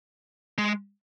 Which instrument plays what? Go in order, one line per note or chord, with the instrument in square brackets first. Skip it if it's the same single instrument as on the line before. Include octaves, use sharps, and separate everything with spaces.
[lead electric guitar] G#3